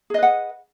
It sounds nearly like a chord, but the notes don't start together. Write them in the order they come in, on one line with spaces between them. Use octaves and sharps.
G#4 D#5 B4 F#5